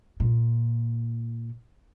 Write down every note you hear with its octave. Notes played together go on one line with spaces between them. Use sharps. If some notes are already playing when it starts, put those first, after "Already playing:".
A#2